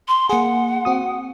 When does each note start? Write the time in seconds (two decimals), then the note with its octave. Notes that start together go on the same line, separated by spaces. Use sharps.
0.08 C6
0.29 A#3 G#4 F#5
0.85 C4 F#4 D#6